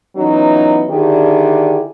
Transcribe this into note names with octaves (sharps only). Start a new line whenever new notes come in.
E3 F#3 B3 C#4 D#4 F4
D3 D#3 D4 E4 G4 G#4